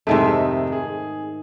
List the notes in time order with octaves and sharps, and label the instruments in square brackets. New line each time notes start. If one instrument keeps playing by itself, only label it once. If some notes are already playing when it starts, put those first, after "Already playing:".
[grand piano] F2 C3 E5 [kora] G#2 D#3 A3
[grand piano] G#4